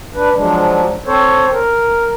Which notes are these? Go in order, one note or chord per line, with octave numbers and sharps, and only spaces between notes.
D4 B4
F3 F#3 G#3 D4
C4 A4 C5 C#5
A#4